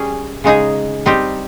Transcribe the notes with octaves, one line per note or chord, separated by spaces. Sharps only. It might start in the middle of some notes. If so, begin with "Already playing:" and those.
Already playing: G3 C#4 G#4
C#3 G#3 D#4 G#4
G3 C4 D#4 G4